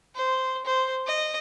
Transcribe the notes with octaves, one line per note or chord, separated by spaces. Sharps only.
C5
C5
D#5